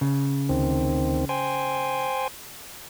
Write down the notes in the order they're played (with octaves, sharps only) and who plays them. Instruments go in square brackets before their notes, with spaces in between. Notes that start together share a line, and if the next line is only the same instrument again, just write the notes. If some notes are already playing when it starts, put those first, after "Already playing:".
[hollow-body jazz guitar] C#3
[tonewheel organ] D2 D#3 C4
C5 G5 G#5